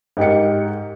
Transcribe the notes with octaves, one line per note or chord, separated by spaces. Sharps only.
G#2 G4 A#4 C#7